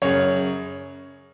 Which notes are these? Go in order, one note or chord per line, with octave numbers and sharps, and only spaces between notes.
F#2 C#3 C#5